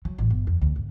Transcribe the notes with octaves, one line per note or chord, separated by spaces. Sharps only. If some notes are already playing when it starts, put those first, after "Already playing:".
F#3
A1
G1
F2
D2
G#1